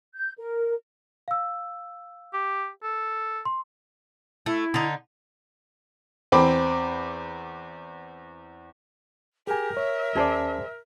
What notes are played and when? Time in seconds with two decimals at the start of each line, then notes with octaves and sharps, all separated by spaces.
0.14 G6
0.38 A#4
1.28 F5 E6
2.33 G4
2.83 A4
3.45 C6
4.46 A3 E4
4.74 D3 D#4
6.32 E2 C4 B5 D6
9.47 G4 G#4 A#4 G#5
9.77 C#5 E5
10.15 D#2 C#4 G#4 C5 D5 A5